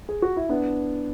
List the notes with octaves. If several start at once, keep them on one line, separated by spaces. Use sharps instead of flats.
G#4
F#4
E4
B3 D4